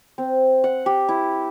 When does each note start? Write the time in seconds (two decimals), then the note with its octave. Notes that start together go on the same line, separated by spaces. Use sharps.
0.18 C4
0.64 F#5
0.86 G4
1.09 E4